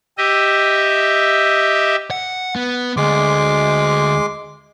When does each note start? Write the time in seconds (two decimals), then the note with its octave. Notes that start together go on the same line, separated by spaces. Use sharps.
0.18 G4 D#5 E5
2.11 F#5
2.56 B3
2.97 D2 G#3 C6 D6